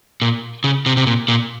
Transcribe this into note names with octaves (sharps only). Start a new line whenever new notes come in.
A#2
C#3
C3
C3
A#2
A#2